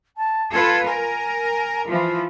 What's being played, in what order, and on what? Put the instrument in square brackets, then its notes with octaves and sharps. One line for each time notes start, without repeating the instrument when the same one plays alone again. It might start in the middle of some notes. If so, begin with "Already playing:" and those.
[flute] A5
[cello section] F4 A4 B4 [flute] G#6
[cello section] A#4 [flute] G#5
[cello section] E3 F3 [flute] F4